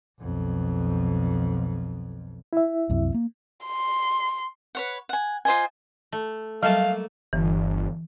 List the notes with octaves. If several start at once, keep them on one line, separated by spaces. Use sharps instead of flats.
B1 F2
E4 E5
C2 F#2 C3
A#3
C6
B4 C#5 F#5
F#5 G#5
F4 C5 D#5 G#5
A3
F#3 G3 A3 A#3 E5 F5 A5
G1 E3